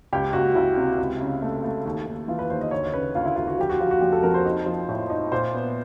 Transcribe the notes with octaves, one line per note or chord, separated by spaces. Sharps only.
C#2 G4
C#2 F#4
C#2 E4
C3
C#2
C#3
A3
A3
D#2
D#2
E3 F4
B4
D#2 C5
D#5
D2 C#5
C#3 B4
D2 F4
E4
D2 F4
F#4
F3 G4
F#4
F3 F4
F#4
F1 G4
A4
F2 A#4
C5
D#4
F3
A2
D#4
A#2 C5
B3